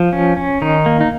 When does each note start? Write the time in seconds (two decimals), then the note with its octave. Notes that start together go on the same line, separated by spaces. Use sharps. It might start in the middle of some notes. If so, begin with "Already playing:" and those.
Already playing: F3
0.13 C#4
0.37 C#4
0.62 D#3 D#4
0.86 A#3
1.01 D#4